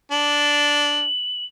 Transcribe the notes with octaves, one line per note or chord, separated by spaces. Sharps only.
D4 F#7